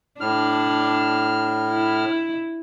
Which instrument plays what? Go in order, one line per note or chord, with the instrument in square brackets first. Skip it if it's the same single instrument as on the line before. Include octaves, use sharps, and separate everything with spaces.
[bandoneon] A2 F6 [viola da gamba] D4
[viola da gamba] E4